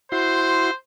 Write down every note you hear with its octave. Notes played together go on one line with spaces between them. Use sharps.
E4 F#4 C5 C6